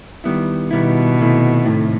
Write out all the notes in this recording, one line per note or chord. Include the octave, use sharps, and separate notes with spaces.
D#3 G3 B3 E4
B2 D#3 G3 B3 E4
C3 D#3 A3 E4
A2 C3 D#3 A3 E4